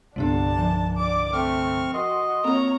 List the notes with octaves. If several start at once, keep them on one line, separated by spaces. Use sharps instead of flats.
C2 G2 D3 G3 B3 D4 G4 A5
F3 G#5 E7
D5 D6
A3 C4 C#6 F6
F#4 A#4 D#5 C6
A#3 C4 F4 C#5 A#5